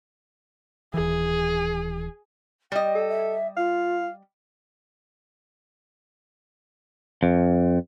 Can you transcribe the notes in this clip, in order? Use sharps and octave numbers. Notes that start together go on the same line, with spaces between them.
D#1 E3 G#4
G3 D#5 G5
A4
E5
F4 F5
F2